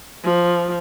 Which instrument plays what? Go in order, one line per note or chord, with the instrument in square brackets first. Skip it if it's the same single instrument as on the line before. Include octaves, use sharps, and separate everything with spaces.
[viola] F3